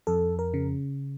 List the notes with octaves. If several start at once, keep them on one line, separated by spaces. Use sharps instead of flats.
F2 A4
A#4
C#3